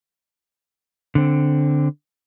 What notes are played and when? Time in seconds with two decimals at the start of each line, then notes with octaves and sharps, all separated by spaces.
1.15 D3 C4